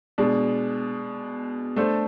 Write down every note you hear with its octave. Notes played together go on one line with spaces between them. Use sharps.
B2 G#3 D4
A3 D4 A4 C5